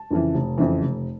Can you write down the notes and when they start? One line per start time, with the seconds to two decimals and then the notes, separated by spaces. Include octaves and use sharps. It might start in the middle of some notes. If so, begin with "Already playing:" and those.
Already playing: A5
0.11 F2 C#3 E3
0.34 F1
0.58 F2 C#3 E3
0.82 F1